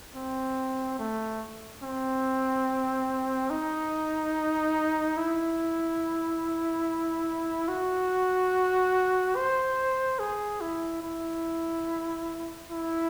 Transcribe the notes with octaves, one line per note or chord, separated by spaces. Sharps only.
C4
A3
C4
D#4
E4
F#4
C5
G#4
E4
E4
E4